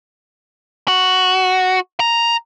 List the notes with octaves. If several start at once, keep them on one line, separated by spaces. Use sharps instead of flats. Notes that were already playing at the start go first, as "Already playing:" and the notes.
F#4
A#5